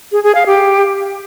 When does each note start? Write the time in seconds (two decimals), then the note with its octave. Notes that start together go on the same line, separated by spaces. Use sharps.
0.12 G#4
0.23 G#4
0.35 F5
0.46 G4